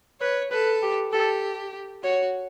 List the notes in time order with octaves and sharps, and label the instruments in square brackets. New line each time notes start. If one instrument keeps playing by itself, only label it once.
[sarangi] B4 [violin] C#5
[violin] A4 [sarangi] B4
[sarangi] G4
[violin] G4 [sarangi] A4
[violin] F#4 [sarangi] C#5